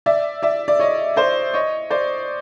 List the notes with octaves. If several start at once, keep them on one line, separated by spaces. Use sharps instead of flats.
D5 E5
D5 E5
D5
C#5 D#5
C5 D5
C#5 D#5
C5 D5